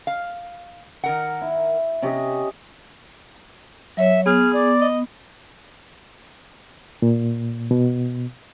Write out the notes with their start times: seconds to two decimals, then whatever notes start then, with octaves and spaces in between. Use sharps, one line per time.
0.07 F5
1.04 D#3 A#4 F#5
1.42 E4
2.02 C3 C#4 G4 D#5
3.97 F#3 C#5 E5
4.26 B3 G#4 F6
4.52 D5
4.81 D#5
7.02 A#2
7.71 B2